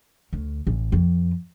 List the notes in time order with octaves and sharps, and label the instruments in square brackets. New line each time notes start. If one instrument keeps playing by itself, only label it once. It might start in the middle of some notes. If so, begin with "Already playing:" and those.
[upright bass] D2
A1
F2